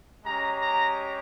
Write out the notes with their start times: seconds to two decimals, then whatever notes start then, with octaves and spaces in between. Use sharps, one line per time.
0.25 G#3 C#4 G4 A#5
0.61 A#5